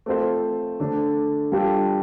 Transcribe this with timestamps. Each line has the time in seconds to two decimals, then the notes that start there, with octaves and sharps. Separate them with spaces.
0.06 A3 C4 F4 C5
0.80 D3 A3 D4
1.52 G3 D4 F4 A4